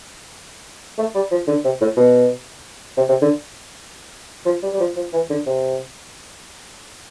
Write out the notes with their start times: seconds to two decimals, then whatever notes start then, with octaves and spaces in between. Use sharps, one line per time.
0.98 A3
1.15 G3
1.31 F3
1.48 D3
1.65 C3
1.81 A2
1.97 B2
2.97 C3
3.09 C3
3.22 D3
4.46 F3
4.63 G3
4.73 G3
4.80 F3
4.96 F3
5.13 E3
5.30 D3
5.47 C3